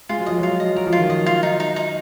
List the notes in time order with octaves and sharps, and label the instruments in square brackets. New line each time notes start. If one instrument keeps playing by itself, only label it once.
[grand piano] G#3 [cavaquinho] F4
[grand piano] F#3
[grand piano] F3 [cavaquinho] D#5
[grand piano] F#3
[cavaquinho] F4
D#5
[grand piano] F#3 [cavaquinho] A#4
[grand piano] F3
[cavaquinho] F4
[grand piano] D#3
[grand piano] F3 [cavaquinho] D#5
[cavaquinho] F4
D#4
D#4
D#4